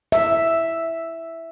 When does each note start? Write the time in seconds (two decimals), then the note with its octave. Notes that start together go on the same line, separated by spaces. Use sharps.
0.12 E5